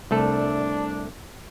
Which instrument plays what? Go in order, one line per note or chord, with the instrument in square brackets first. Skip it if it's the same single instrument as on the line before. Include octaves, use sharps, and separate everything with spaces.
[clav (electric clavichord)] C2 A3 A4 [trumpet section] D4